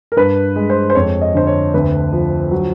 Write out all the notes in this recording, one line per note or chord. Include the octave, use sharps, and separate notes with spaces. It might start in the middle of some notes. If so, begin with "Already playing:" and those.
A#4
G2 B4
G#3
C5
C5
F2 C#5
D#5
D3 C5
C#5
D2 B4
F3
F#3